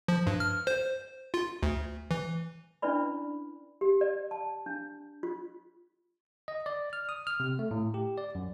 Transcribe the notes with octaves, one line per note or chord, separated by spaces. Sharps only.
F3
G2
F6
C5
F4
D2
E3
C#4 D4 E4 B4 D5 B5
G4
D5
A5
D4
F4
D#5
D5
F6
D#6
F6
C3
A3
A2
G4
D5
F#2